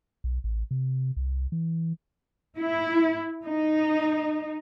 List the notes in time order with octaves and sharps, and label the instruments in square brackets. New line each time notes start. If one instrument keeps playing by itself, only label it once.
[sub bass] B1
A1
C3
C2
E3
[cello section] E4
D#4